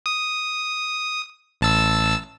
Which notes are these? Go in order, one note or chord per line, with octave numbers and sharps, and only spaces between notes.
D#6
A1 A5 E6